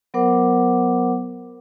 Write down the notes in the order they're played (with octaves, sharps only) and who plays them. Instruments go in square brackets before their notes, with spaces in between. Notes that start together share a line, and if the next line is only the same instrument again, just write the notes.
[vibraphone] F#3 B3 A#4 C5 F#5 D6